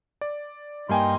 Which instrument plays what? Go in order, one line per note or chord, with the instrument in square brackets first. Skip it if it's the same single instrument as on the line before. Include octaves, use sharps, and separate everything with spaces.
[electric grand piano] D5
[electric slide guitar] G2 G5 [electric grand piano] G3 A#3 G#5 [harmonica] D#4 C6